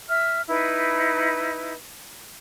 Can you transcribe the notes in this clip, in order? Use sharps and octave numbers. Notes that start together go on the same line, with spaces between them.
E5 F6
D#4 E4 B4